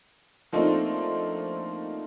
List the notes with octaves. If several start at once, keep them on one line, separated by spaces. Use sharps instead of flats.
F3 A3 A#3 C4 D4 D#4